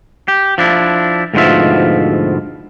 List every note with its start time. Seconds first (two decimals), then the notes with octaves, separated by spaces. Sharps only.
0.28 G4
0.58 F3 D4 E4
1.34 D2 G#2 B2 F3 F4 E5